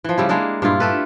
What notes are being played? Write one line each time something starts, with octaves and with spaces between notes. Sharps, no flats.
E3 F3
C#3 G3 E4
G#3 A#3 D4 G#4
G2 A#2 E4 F4
A3 G4 A4 B4